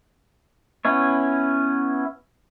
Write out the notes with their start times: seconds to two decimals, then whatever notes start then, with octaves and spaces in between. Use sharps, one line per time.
0.85 B3 C#4 E4 C#5